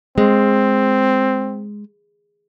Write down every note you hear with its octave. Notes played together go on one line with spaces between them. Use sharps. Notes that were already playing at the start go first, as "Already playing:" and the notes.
G#3 C4